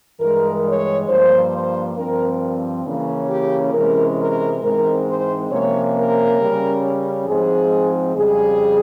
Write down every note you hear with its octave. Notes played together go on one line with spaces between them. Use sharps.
G2 E3 G#3 A#4
C#5
G2 F3 A#3 C5
C5
G2 F3 C4 A#4
C#3 E3 A#3 C#4
G4
C3 E3 G#3 C#4 A#4
A#4
G#2 E3 G#3 C4 A#4
C5
C3 F3 A#3 C#4 C#5
A#4
C#3 G3 C#4
G#2 F3 G#3 C4 G#4
F2 C#3 G3 G#4